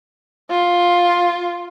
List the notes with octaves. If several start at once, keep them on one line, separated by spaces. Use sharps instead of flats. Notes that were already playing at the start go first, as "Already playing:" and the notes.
F4